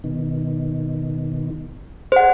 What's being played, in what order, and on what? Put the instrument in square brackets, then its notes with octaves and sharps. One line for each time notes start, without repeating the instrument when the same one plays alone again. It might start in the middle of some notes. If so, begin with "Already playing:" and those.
[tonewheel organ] B2 D#3
[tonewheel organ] G#4 D5 [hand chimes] C5 F#5